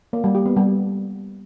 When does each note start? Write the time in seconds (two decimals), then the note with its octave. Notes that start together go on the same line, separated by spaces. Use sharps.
0.13 A#3
0.24 G3
0.35 G4
0.46 B3
0.56 G3